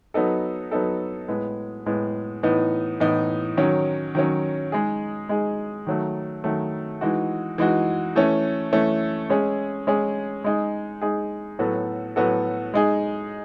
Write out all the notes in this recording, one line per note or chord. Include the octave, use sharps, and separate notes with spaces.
F#3 B3 D#4 A4
F#3 B3 D#4 A4
A2 G#3 B3
A2 G#3 B3
A2 E3 B3 D#4
A2 E3 B3 D#4
D#3 F#3 C#4
D#3 F#3 C#4
G#3 D#4 G#4
G#3 D#4 G#4
D#3 F#3 A3
D#3 F#3 A3
E3 G#3 D#4 F#4
E3 G#3 D#4 F#4
E3 A3 C#4
E3 A3 C#4
G#3 C#4 G#4
G#3 C#4 G#4
G#3 D#4 G#4
G#3 D#4 G#4
A2 F#3 B3 F#4 A4
A2 F#3 B3 F#4 A4
G#3 D#4 G#4